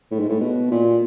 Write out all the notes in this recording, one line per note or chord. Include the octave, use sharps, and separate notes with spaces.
A2
G#2
A2
B2
A#2